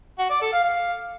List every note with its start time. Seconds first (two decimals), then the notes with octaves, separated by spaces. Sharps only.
0.19 F#4
0.30 D5
0.41 A4
0.53 F5
0.64 F5